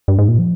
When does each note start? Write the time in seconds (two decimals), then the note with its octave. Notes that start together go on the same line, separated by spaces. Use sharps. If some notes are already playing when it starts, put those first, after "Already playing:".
0.08 G2
0.19 G#2
0.28 A#2
0.39 F3